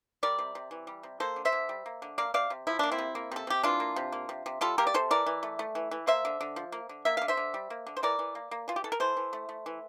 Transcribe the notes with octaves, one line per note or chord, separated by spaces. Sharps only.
G3 A#4 D5
C3
C3
E3
G3
C3
A#3 A4 C5
D3
C5 E5
D3
G3
A#3
D3
A#3 D5 F5
C3 D5 F5
C3
F3 E4
A#3 D4
C4 E4
C3
A#3
C3 A4
C3 G4
E3 D4 F4
A#3
C3
A#3
C3
C3
G3 F4 A4
A#3 G4 A#4
D5
C3 A4 C5
E3 A#4 D5
E3
A3
A3
E3
E3
A#3 C5 E5
D3
D3
F3
A#3
D3
A#3 E5
D3 F5
C5 E5
D3
G3
A#3
D3
C5
E3 A#4 D5
E3
A#3
A#3
E3 F4
G4
E3 A4
A#4
E3 A4 C5
E3
A3
A3
E3